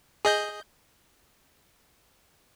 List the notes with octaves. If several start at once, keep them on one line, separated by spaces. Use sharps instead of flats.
G#4 D#5 G6